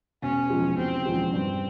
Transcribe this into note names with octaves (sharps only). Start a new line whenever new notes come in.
E1 C#4
E2 C#3 F3 G#3
E1 C4
E2 C#3 F3 G#3
G2 C4